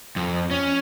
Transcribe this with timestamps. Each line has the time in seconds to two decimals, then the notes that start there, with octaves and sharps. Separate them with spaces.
0.16 F2
0.51 C#4